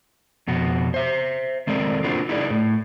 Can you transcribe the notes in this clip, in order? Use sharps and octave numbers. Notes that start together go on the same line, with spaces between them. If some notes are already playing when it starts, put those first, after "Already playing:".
F2 B2 F#4
C5 E5
D#3 G#3 C4 A4 A#4 D5
A#3 C4 D4 F4 F#4
D#4 E4 G#4 A#4 C#5 D5
A2